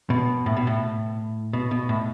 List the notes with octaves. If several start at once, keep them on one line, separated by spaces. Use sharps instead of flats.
B2
A2
B2
A2
B2
B2
A2